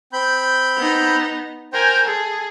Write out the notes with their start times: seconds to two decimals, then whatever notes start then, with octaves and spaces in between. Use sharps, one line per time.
0.13 C4 B5 G6
0.77 B3 D#4
1.73 A#4 C5 G5 G#5
2.06 G#4 A4